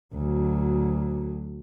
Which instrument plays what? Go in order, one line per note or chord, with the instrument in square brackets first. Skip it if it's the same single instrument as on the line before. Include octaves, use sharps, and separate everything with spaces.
[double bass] D2 F#3